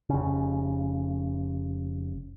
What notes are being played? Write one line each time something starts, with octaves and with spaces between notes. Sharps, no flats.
F1 C#3